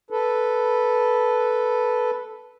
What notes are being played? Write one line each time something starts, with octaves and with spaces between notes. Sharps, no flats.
A4 B4